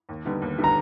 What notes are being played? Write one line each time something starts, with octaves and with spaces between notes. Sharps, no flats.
D#2
D3 G3 B3 D#4
D#2
D3 G3 B3 D#4
A#5